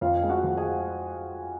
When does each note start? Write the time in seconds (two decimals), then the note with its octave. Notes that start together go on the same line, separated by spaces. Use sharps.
0.01 F2 F4 F5
0.23 G#3
0.29 F#4 F#5
0.44 F3
0.57 G#4 G#5